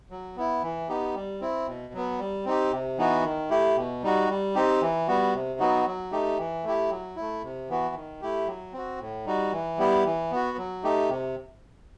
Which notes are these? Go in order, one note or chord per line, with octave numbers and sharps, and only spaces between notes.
F#3
B3 E4
E3
B3 D#4 G4
G3
C4 E4
B2
F#3 B3
G3
C4 D#4 G4
C3
E3 B3 D#4 F#4
D#3
A3 E4 G4
B2
G3 D#4 F#4
G3
C4 D#4 G4
E3
G3 B3 F#4
C3
F#3 B3 D#4 F#4
F#3
A3 D#4 G4
E3
A3 E4 G4
F#3
A3 E4
C3
E3 B3 F#4
D#3
A3 E4 G4
F#3
C4 F#4
A2
G3 D#4 F#4
E3
G3 B3 E4 G4
E3
B3 F#4
F#3
A3 D#4 G4
C3